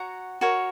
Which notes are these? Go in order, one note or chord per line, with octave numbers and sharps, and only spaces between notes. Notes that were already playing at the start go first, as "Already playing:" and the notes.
Already playing: F#4 C#5 F#5 A#5
F#4 A#4 C#5